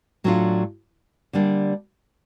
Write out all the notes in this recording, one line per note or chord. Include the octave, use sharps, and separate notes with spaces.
A2 F#3 A3 D4 F4
D3 G3 A#3 D4